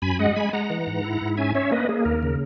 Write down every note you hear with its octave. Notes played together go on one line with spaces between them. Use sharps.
F#2 G#5 B5
G#3 D#5 F#5
G#3 G#5 B5
G#3 F#5 A#5
E3
G#2
E4
G#2
C#4 E5 G#5
C#4 C#5 E5
A#3 B4 D#5
A#3 G#4
D#2 A#4
C#3